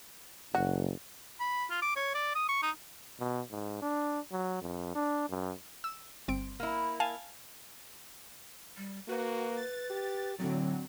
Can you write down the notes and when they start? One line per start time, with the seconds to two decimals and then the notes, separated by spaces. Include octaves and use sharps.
0.55 F#1 F#4
1.40 B5
1.71 F4
1.82 D6
1.96 C#5
2.15 D5
2.35 D#6
2.49 C#6
2.63 D#4
3.19 B2
3.50 G#2
3.82 D4
4.32 F#3
4.62 F2
4.95 D4
5.29 F#2
5.84 E6
6.28 G1 C4 D7
6.60 A#3 E4
7.00 F5 G#5 A5
8.77 G3
9.08 A#3 F#4 B4
9.57 A6
9.90 G4
10.39 A2 D3 F#3 C4